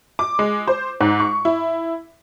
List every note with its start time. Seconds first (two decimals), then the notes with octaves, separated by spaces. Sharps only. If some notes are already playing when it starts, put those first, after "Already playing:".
0.19 D6
0.39 G#3
0.68 C5
1.01 G#2
1.20 C#6
1.45 E4